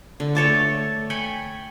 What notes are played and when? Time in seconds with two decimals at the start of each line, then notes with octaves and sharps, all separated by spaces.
0.20 D3
0.35 A3 C#5 A5 D6
1.10 G5 G#5 B5 C#6